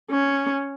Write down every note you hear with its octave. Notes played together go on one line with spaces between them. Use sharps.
C#4